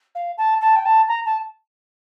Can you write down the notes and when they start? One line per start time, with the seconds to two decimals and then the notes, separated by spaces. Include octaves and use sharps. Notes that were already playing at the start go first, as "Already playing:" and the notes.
0.15 F5
0.37 A5
0.61 A5
0.76 G5
0.85 A5
1.08 A#5
1.25 A5